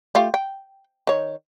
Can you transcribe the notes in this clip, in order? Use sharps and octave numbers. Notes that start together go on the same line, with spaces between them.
A3 F4 G4
G5
D#3 C#5